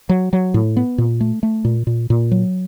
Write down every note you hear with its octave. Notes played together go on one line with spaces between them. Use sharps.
F#3
F#3
A2
B3
A#2
A3
A3
A#2
A#2
A#2
F#3